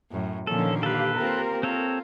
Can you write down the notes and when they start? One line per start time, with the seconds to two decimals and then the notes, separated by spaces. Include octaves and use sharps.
0.11 F#2 A2
0.47 A#2 D3 D#3 F3 A#3 C#4 A4
0.83 G4 A4 B4 F5
1.17 A#3 C4 F4 G4 A#4
1.63 C4 F4 A4 C#5